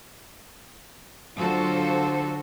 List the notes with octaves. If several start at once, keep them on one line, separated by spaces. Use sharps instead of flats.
D3 F#3 F4 F#4 A4 C5